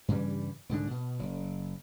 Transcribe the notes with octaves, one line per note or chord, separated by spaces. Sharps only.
G2 C#3 E3 G3
C2 G#2 D3 D4
B2
F#1